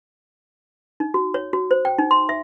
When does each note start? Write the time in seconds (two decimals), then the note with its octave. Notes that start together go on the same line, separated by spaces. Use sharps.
1.00 D#4
1.14 F#4
1.34 C#5
1.53 F#4
1.71 C5
1.85 G5
1.98 D#4
2.11 C6
2.29 E5